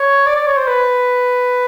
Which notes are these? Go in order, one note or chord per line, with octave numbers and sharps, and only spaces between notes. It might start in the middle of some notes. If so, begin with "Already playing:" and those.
Already playing: C#5
D5
D5
C#5
C5
B4